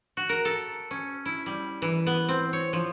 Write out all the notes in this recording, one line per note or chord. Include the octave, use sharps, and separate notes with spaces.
F#4
A#4
A4
C#4
E4
G3
E3
B3
C4
C#5
F3